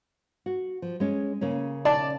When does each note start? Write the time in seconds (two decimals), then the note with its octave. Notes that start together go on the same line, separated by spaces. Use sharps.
0.46 F#4
0.82 F3
1.00 G#3 C#4
1.41 C#3 A#3 C#4
1.85 D5 A5